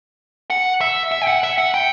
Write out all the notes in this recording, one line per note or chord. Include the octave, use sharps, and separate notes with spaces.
F#5
E5
E5
G5
F#5
E5
F#5
G5